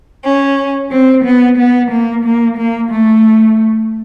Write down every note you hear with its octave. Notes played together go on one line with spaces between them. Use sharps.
C#4
C4
B3
B3
A#3
A#3
A#3
A3